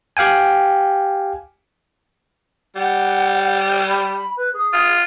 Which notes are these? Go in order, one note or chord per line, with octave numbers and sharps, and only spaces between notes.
G4 F5 G5 G#5
G3 F#5
B5
B4
G#4
F4